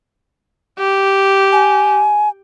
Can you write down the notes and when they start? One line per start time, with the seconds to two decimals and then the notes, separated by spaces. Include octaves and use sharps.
0.79 G4
1.52 G#5